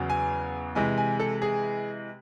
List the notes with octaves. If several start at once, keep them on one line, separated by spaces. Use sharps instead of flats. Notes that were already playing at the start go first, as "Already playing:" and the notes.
Already playing: E2 C#3 F#3
G#5
C3 E3 G#3 G#5
G#5
A4
G#4